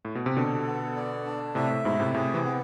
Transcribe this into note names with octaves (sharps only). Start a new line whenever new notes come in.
A2
B2
C3
B2 D3 A4
B3
D5
D4
A2 C3 E5
A2
G#2 B2 E4
A2 C3
A2 C3 G#4
C3 E3
B3